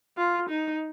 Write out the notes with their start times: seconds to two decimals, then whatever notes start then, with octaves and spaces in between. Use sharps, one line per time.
0.18 F4
0.49 D#4